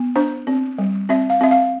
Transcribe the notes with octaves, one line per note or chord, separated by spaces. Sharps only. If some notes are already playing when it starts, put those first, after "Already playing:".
Already playing: B3
D4 C5
C4
G3
C4 E5
F5
C4 E5
F5